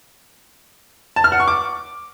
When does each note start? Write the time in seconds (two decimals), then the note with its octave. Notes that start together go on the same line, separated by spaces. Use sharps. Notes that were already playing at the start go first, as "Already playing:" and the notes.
1.16 A5
1.24 F6
1.32 F#5
1.40 C#6
1.48 D6